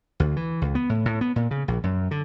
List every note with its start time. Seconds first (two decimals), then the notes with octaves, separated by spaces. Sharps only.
0.20 D2
0.36 E3
0.62 C#2
0.75 B3
0.89 A2
1.05 A2
1.21 B3
1.36 A#2
1.51 C#3
1.68 A#1
1.84 F#2
2.11 D3